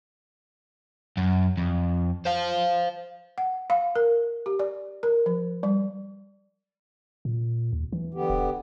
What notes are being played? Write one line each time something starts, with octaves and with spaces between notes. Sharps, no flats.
F#2
F2
C5 F5
F#5
F5
A#4
G4
D5
A#4
F3
G3
A#2
D#2
E3
D3 B3 G4
E1